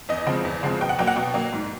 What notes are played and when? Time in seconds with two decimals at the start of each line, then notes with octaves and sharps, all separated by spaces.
0.09 E2 D#5
0.27 C#3 F3 G#3 C4
0.45 E2
0.63 C#3 F3 G#3 C4
0.81 B2 G5
0.89 F#5
0.99 F#3 A#3 G5
1.07 F#5
1.16 B2 G5
1.34 F#3 A#3
1.53 G#2